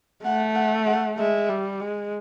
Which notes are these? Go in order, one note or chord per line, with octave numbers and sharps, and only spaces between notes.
A3 F#5
F#5
F#5
G#3 E5
G3
G#3